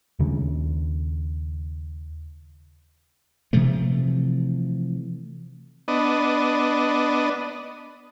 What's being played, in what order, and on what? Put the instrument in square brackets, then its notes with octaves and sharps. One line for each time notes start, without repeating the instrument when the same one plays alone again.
[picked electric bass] D#2 C#3
[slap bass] C3 E3 F3 A3
[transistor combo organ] B3 D4 D#5